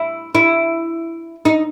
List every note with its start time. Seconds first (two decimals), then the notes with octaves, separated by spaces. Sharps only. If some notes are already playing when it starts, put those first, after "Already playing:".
Already playing: E4
0.35 E4
1.45 D#4